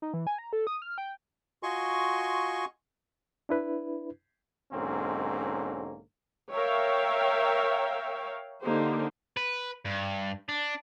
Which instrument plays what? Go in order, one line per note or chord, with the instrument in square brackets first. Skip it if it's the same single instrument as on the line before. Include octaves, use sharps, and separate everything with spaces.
[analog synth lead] D#4
E3
G#5
A#5
A4
D#6
F6
G5
[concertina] F4 F#4 D#5 G#5 C6 C#6
[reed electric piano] D4 E4 B4
[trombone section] B1 G#2 D3 A#3 C4 C#4
[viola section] A#4 C#5 E5 F5 G5
D3 A#3 D#4 G4 C5
[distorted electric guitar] B4
G2
D4